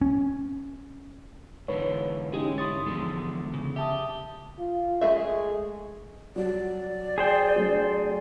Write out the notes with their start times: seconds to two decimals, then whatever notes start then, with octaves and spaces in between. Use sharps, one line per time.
0.01 C#4
1.68 G#2 D3 E3 B4 C#5
2.34 G#3 C#4 D#4 G4 G#4
2.58 E4 C#5 C6 D#6 A6
2.86 E2 D3 F3 G#3
3.54 C#3
3.76 G4 E5 A5 D#6
4.59 F4
5.01 G#3 A3 G#4 E5
6.36 F#3 G3 F#4 D5
7.18 G#4 C5 G5
7.56 F#3 A3 D4